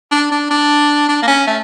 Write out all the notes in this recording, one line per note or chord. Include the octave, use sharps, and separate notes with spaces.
D4
D4
D4
D4
A#3
C#4
A3